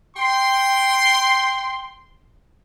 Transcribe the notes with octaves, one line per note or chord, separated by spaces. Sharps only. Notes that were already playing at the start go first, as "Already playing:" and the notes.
G5 C6